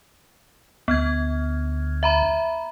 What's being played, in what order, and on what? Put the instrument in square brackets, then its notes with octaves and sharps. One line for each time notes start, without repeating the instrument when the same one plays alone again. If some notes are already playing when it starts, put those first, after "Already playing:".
[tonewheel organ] D2 [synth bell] B3 F6 G#6
[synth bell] E5 A#5 B5